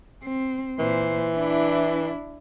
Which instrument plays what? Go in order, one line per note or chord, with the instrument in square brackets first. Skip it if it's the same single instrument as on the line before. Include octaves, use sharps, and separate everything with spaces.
[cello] C4
[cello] A#2 C5 [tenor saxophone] E3
[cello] D4 E4